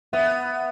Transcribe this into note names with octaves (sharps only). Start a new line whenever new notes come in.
B3 E5